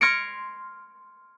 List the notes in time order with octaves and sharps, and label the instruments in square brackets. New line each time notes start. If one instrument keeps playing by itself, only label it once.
[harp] C6 F6 G#6 A#6 C#7 D7